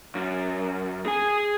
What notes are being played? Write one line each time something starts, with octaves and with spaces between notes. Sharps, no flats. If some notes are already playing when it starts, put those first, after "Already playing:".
F#2
G#4 G#5